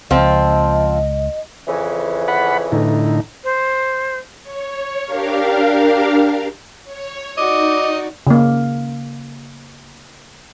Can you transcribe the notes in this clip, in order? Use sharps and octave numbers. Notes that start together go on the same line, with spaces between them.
C#2 F3 C4 D#5
F2 C#3 E3
F#5 B5
A2 D3 D#4
C5
C#5
D4 G4 A#4 F5
C#5
D#4 F#4 D5 D#5 D6
C#3 A#3